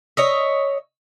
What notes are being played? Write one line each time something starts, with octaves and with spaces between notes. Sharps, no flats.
C#5 D#5 E5